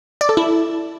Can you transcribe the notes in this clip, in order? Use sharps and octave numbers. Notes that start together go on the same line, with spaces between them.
D5
A4
E4